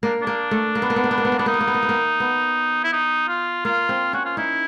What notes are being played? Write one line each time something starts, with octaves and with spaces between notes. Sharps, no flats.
A#3 D4
D4
A#3
A3
A#3
B3
A#3
B3
A#3
B3
A#3
B3
A#3
B3 D4
A#3 D#4
B3
A#3
B3
A#3
B3
A#3
B3
E4
D#4
F4
A#3 F4
C4
C#4 F#4
F4
D#4 E4